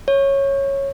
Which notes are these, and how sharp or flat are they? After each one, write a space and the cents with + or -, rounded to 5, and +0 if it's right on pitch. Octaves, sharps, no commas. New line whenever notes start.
C#5 -10